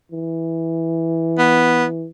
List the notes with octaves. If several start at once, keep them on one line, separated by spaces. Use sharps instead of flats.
E3
B3